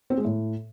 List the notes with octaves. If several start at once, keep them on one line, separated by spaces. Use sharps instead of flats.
C4
G#3
A2